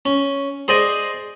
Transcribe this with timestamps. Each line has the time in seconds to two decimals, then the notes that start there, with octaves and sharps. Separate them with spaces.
0.06 C#4
0.68 G#4 C5 D5 D#5 G#5